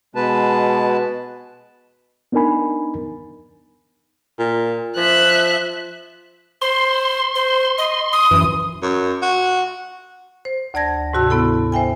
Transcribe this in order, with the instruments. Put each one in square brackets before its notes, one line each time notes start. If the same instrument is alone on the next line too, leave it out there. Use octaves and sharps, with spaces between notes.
[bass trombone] B2 [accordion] G#3 B4 A5
[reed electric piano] B3 D4 D#4 A#4 G#5 B5
[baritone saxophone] A#2
[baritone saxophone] F3 [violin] E5 F#6
[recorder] C5 [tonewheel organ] C6
[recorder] C5
D#5
D#6
[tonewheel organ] F#2 E3
[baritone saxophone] F#2
F#4
[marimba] C5
D2 D5 A5 G#6 A#6
G#2 C3 F#4 A5 E6
B3 E4 A4
C5 E5 G5 G#5